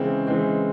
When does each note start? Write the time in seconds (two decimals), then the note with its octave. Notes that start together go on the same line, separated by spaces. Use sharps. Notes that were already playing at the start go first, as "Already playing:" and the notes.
Already playing: C#3 E3 G#3 C4
0.27 C#3 E3 G#3 C4